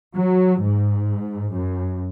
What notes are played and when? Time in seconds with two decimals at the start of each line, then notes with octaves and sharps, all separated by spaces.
0.16 F#3
0.61 G#2
1.51 F#2